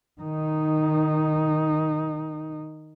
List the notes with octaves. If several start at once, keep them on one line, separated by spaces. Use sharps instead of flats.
D#3 D#4